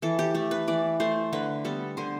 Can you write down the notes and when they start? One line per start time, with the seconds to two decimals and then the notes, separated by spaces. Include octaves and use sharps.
0.02 E3 A4
0.19 G4
0.35 A3 A4
0.51 B4
0.68 E3 D5
1.00 A3 C5
1.33 D3 B4
1.64 G3 B3 A4
1.97 D3 C5